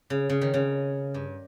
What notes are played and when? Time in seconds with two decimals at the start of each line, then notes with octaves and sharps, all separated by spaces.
0.10 C#3
0.29 C#3
0.41 D#3
0.54 C#3
1.14 G2